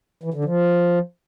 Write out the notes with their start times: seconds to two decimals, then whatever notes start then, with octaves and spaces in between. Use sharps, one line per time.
0.23 E3
0.34 D3
0.44 F3